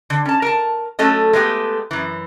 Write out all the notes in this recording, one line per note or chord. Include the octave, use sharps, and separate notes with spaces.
D3
C#4 A5
A#4 A5
F#3 A3 C#4 A4 D#5
G#3 A3 B3 G4
F#2 E3